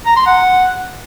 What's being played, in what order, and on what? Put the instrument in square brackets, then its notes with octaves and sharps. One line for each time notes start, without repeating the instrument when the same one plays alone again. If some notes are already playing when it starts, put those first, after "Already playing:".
[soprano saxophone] A#5
C6
F#5